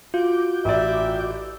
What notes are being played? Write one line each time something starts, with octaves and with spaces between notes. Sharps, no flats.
F4 F#4 D6 G6
A1 D5 E5